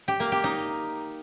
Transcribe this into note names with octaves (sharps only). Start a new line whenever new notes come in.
G4
A#3
G4
D#4